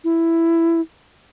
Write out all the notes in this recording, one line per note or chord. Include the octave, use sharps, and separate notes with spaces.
E4